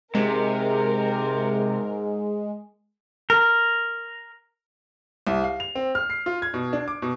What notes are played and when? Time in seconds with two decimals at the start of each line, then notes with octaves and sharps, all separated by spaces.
0.15 G#2 C3 G#3 A#4
3.30 A#4
5.27 C2
5.44 F5
5.60 F7
5.75 C4
5.95 F6
6.10 C7
6.26 F4
6.42 G#6
6.54 B2
6.73 D4
6.88 D6
7.02 B2